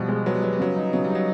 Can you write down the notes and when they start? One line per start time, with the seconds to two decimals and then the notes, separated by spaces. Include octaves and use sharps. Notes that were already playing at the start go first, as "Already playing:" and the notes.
Already playing: B2 F3 G3
0.09 G#3
0.26 F#3 B3
0.35 G3
0.43 F#3 B3
0.53 G3
0.59 C#3 F#3
0.76 D#4
0.93 C#3 F#3
1.04 G3
1.10 D#4
1.15 F#3